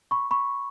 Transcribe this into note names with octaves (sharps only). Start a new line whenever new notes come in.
B5 C#6
B5 C#6